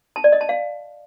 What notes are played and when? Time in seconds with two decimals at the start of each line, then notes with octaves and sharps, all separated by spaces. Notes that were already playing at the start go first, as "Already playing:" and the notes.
0.16 A5
0.24 D5
0.32 D#5
0.41 A5
0.49 F5